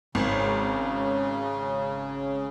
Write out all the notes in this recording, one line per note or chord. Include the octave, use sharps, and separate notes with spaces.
G#1 C#3